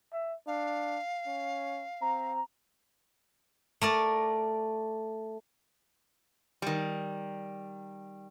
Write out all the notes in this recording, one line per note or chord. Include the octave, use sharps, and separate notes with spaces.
E5
D4 F5
C#4
C4 A#5
A3 A#4 D5
D#3 G3